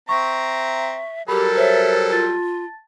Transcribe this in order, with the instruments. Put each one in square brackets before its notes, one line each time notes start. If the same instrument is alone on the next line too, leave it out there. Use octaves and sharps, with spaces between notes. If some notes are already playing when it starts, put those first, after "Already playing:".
[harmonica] C4 A#5 [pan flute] E5 [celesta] C#6 A#6
[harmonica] F#3 G3 A4 [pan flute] G4 [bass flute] A#4 [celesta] B5
[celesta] C5 C#5 [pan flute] E5
[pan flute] F4 [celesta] A5 A6